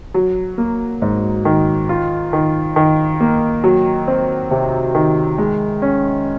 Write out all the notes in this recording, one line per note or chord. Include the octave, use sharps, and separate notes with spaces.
F#3
A#3
G#2
D#3
F4
D#3
D#3
A#3
F#3
C4
C3
D#3
G#3
C#4